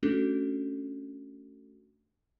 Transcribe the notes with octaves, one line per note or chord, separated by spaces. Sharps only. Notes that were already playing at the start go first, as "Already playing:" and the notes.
A3 C#4 D4 F#4 A4